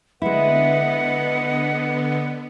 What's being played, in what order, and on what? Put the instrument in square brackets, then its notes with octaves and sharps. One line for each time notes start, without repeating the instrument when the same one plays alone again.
[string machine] D3 B3 [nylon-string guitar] G#3 E4 [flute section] B4 D#5 F#5